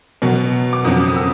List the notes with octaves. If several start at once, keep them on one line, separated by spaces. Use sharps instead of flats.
B2 F#3
D6
F2 C#3 F#3 D#6
D#6
E6